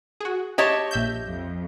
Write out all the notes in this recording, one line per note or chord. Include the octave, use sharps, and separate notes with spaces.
F#4 G#4
G4 C#5 D#5 A5
A#1 E5 G6
F2